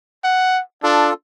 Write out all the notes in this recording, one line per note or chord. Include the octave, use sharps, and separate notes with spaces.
F#5
D4 F4 A4